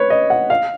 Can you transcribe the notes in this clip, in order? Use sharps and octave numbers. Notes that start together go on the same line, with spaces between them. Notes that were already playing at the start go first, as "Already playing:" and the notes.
Already playing: B4 C#5
D#5
F#5
F5